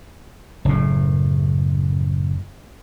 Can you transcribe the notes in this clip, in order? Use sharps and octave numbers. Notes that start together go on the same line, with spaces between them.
F#1 A2